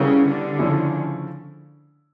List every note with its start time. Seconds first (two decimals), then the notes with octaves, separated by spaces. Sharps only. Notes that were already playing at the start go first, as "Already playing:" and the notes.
Already playing: C#3 G3 B3 E4 G4 A#4
0.26 D3
0.59 C#3 F3 A3 C#4 E4